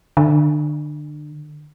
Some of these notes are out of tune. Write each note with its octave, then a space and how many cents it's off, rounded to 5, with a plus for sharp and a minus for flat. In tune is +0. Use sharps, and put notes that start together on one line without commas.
D3 +30